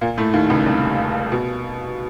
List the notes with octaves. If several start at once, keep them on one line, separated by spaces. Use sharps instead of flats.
A#2 A#3
A2 A3
D#2 D#3
C#2 C#3
C2 C3
B2